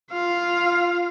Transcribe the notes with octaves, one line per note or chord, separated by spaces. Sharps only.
F4 F5